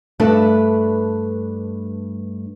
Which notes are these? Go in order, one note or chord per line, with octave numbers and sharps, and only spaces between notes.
G2 A3 D4 B4 A5